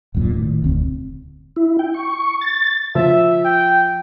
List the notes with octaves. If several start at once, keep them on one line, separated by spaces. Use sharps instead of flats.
D1 B1 F#2 A#2
A2 D#3
E1 D2 C4
E4
G5
C#6
A6
F3 E5
G5